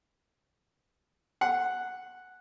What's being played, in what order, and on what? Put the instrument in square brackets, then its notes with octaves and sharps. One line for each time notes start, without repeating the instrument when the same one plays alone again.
[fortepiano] F#5